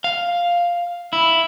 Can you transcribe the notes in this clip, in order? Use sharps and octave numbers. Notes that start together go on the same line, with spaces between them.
F5
E4